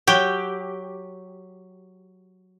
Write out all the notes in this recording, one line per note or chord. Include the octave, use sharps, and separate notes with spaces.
F#3 G4